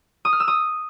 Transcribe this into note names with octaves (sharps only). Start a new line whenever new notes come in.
D#6
F6
E6
D#6